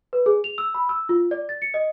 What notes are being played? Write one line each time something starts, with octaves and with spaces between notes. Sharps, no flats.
B4
G#4
F7
E6
B5
E6
F4
D5
A6
C#7
D#5